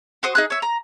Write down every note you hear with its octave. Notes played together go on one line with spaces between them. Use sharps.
F#4 C5 D#6
D#4 G#4 F#6
C#5 E5
A#5